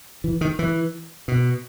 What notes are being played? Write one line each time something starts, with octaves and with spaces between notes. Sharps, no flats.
E3
D#3
E3
B2